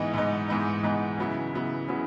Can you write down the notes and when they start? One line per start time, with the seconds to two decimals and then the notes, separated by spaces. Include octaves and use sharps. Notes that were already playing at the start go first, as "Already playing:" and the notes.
Already playing: G#2 E3 B3 D#4
0.13 G#2 E3 B3 D#4
0.48 G#2 E3 B3 D#4
0.83 G#2 E3 B3 D#4
1.18 C#3 F#3 B3 E4
1.53 C#3 F#3 B3 E4
1.88 C#3 F#3 B3 E4